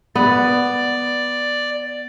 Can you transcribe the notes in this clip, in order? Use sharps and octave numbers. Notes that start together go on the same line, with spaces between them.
B3 D5